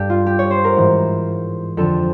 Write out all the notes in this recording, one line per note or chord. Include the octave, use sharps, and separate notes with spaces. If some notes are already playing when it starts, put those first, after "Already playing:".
Already playing: G2 G4 A4
F4
G4
C#5
C5
A#4
G#2 E3
F2 D3 A4